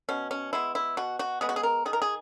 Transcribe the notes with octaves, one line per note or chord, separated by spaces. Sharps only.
B2 C#4
C#4
G#3 B3 E4
E4
B2 F#4
F#4
G#3 B3 G#4
F#4
G#4
A#4
D#3 G#4
A#4
G#4